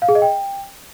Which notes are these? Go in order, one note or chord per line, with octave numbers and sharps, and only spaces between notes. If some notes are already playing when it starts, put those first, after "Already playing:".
F5
G#4
D#5
G5